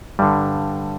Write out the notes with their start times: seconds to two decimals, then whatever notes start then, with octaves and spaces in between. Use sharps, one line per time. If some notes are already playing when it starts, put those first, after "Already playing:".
0.19 G2 D3 G3